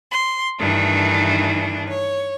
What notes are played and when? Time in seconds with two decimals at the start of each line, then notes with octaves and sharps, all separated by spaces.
0.11 C6
0.59 G2 D#3 E3 A3 D4
1.89 C#5